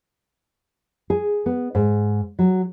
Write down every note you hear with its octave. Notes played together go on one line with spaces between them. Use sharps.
G#4
B3
G#2
F#3